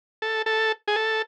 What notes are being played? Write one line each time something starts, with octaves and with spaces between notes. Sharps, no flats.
A4
A4
G#4
A4